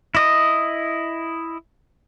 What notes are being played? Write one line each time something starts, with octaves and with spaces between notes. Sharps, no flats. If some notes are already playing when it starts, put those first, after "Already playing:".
E4 D#5 D#6